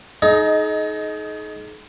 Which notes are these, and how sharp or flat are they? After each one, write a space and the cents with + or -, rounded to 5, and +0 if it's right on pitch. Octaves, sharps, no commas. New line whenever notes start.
D#4 +10 G#4 +45 D#5 +0